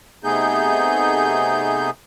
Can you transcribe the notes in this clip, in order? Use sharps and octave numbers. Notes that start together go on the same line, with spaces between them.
C3 A3 B3 D#4 G#4 G6